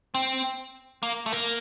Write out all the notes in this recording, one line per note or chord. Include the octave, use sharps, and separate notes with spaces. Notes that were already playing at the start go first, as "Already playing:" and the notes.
C4
A#3
A3
A#3